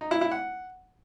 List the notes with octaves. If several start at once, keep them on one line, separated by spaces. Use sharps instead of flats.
D#4
E4
E4
F#5